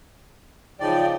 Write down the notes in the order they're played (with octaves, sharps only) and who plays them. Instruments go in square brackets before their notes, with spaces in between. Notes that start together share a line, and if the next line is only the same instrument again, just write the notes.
[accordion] C#3 F3 D5 [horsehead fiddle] D#4 G5